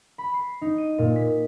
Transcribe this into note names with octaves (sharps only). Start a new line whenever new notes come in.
B5
C7
D#4
D#7
A#2
B6